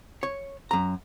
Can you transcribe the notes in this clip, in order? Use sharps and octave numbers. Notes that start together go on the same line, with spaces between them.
C#5
F#2 A#5